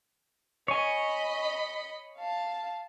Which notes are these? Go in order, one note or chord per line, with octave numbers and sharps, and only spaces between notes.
C#5 D#5 G#5 B5
F5 A5